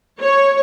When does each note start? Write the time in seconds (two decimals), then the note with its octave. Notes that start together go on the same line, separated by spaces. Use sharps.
0.22 C#5